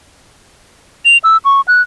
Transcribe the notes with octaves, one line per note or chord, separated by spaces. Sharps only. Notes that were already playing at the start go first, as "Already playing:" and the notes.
F7
E6
C#6
F#6